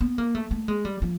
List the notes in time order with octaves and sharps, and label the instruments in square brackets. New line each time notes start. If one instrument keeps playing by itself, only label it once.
[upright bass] B3
A#3
A3
A3
G#3
G3
F3